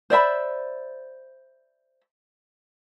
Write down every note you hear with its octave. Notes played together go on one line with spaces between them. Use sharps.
C5 D5 E5 B5